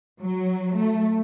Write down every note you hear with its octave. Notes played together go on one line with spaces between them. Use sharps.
F#3
A3